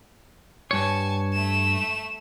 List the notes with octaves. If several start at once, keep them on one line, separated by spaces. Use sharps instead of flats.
G2 C#5 G#5 A5
A3 E7